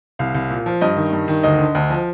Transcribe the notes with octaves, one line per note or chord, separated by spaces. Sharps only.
C2 F5
C2
A#2
F3
G2 D#5
D#3
G2
D#3
D2 D#5
D3
D2
F3